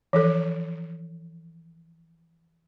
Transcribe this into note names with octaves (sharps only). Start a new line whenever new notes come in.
E3 F3 A4